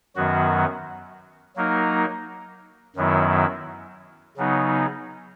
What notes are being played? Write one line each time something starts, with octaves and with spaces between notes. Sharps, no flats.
F#2 D#3 F#3 B3 F#4
F#3 A#3 D#4 A#4
F#2 D#3 F#3 B3 E4
C#3 F#3 B3 D#4